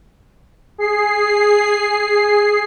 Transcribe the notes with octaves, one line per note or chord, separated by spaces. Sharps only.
G#4 C7